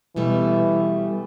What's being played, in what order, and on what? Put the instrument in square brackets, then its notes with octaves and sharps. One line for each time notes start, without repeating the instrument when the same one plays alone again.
[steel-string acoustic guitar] B2 G3 A3 [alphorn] E3